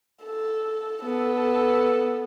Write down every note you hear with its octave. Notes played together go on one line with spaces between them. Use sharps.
A4
B3 A4